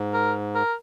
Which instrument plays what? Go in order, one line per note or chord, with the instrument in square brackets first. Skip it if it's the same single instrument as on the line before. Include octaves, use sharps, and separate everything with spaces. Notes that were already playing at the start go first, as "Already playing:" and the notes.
Already playing: [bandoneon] G#2
[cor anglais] A#4
A#4